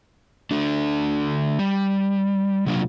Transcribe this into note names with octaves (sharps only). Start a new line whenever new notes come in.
D3 A3 D4
G3
C3 F#3 A#3 D4 F4